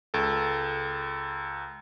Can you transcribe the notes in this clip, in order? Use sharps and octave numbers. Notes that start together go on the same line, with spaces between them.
C#2 A4